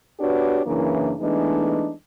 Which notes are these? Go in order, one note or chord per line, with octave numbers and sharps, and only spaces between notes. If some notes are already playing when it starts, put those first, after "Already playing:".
B3 D4 F#4 G4 B4 C#5
F#2 C#3 E3 A#3 D4 E4
E3 G#3 A3 B3 D4 D#4